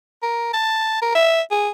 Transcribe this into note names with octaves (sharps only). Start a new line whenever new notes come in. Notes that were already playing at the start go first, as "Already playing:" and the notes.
A#4
A5
A#4
E5
G#4